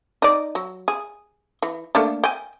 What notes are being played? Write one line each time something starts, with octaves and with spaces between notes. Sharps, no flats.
D#4 D5
F#3
G#4
E3
A3 A#3 D4
G5 G#5